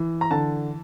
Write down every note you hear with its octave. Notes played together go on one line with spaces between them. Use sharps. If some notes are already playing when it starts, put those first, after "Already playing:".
Already playing: E3
A#5
D3 A5